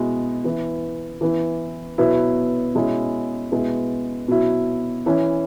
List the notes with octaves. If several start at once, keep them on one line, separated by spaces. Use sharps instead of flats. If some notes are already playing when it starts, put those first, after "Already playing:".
Already playing: B2 G#3 E4
E3 B3 E4
E3 B3 E4
B2 F#3 B3 E4
B2 G#3 C#4 E4
B2 G#3 B3 E4
B2 F#3 E4
E3 C#4 E4